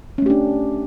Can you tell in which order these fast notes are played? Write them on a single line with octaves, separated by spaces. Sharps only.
C#4 A3 G4 D4